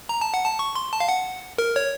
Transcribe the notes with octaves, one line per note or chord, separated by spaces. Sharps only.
A#5
A5
F#5
A5
C#6
C6
A5
F5
F#5
A#4
C#5